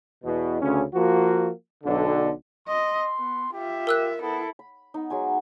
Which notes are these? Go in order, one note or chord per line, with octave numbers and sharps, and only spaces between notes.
E2 B2
D2 C#3 C#4
F3 A#3 F#4
B1 D3
D#5 C6
B3
F4 G4 E5
A#4 E6 F#6
B3 E4 A4
B5
B3 D#4
F#3 G#3 G#5